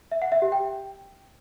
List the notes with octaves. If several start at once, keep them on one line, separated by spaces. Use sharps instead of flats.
E5
F#5
E5
G4
G5